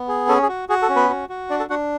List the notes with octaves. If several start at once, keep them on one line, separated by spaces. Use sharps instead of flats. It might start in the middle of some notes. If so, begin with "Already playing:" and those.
Already playing: B3
G#4
C#4 A4
G#4
F#4
F#4 G#4
A4
C#4
B3 B4
F#4
F#4
D4 D5
A4 A5
D4 F#4 F#5